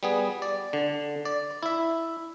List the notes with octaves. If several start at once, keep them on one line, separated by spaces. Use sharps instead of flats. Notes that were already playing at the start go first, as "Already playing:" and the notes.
G3 B3 G#4
D5
D3
D5
E4 E5